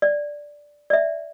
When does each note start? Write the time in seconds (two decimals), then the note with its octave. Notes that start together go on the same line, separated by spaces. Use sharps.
0.02 D5
0.90 D5
0.93 E5